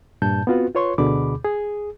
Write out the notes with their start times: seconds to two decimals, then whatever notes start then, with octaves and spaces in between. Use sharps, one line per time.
0.22 G2 A#2 A5 G6
0.47 B3 C4 F4 F#4 B4
0.75 F4 B4 C#5 C6 C#6
0.98 D2 B2 D3 G#4 B5 D6
1.45 G#4